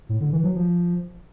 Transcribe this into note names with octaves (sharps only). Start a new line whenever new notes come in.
A2
D3
E3
F#3
F3